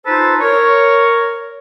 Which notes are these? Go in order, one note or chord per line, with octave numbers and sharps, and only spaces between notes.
D#4 F4 A4 B4 C5
A#4 C#5